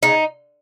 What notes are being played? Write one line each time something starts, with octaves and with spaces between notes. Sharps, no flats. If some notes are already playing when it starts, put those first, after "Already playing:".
C#3 D#4